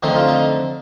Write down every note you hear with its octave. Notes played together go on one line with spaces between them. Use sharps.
F2 D3 A3 C4 D#4
F4
D#4